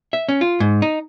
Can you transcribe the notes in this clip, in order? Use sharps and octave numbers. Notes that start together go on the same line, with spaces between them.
E5
C#4
F4
G#2
D#4